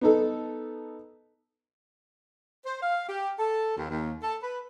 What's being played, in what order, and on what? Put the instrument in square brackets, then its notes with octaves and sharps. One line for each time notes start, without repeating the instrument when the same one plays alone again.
[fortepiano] B3 D#4 A4
[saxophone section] C5
F5
G4
A4
D#2
D#2
A4
B4